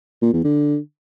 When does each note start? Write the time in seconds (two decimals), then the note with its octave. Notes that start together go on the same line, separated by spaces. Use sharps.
0.22 A#2
0.33 E2
0.44 D3